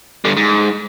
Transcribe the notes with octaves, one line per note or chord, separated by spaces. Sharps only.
G2 D3
G#2